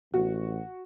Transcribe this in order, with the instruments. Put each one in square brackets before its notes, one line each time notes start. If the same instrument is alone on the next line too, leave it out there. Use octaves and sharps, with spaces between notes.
[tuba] A1 [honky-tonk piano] F#4